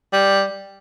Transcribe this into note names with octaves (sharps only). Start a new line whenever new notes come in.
G3